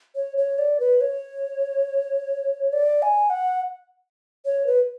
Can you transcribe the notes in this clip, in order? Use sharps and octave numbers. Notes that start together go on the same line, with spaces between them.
C#5
C#5
D5
B4
C#5
D5
G#5
F#5
C#5
B4